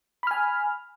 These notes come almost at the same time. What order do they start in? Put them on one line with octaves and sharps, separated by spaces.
B5 F6 G#5